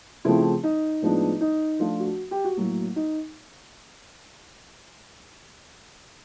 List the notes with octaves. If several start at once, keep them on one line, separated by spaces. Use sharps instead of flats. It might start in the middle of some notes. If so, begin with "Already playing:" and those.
C#3 F3 A3 C4 E4
D#4
A2 F3 G#3 B3 D4
D#4
F3 A3 D4 F4
F#4
G4
F#4
A2 F#3 A#3
D#4